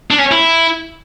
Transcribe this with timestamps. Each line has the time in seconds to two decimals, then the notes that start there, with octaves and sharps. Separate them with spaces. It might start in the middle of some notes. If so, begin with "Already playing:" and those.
0.11 D4
0.18 C#4
0.31 E4